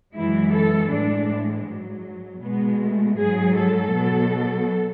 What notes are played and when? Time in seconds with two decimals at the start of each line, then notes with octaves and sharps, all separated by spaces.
0.16 F#2 E3 G#3 E4
0.53 A4
0.91 A2 E3 G#3 D4
1.67 G#2 F#3
2.42 B2 G#3 B3
2.81 A3
3.17 G#2 F#3 G#4
3.56 A4
3.94 B2 F#3